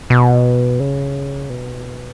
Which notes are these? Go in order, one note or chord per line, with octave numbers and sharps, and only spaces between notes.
B2
C#3
B2